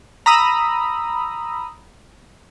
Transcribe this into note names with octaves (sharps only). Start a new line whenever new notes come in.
A#5 B5 D#6 E6